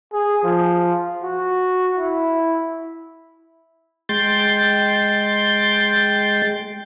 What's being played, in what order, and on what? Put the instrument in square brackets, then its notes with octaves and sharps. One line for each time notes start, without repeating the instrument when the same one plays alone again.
[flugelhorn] G#4
F3
F#4
E4
[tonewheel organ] G#3 G5 C6 G6 A6